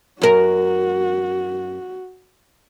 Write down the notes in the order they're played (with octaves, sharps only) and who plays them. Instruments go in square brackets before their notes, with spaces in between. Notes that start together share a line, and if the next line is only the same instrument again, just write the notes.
[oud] F#2 A#4 [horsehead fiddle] F#4